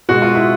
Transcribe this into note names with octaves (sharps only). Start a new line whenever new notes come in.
B2 G#3 F#4
F4
E4